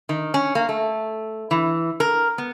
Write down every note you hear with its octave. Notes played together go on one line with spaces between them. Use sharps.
D#3
C#4
A#3
A3
E3
A#4
B3